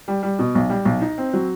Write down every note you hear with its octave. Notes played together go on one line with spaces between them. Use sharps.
G3
G3
B2
B1
G3
B1
D#4
C4
F#3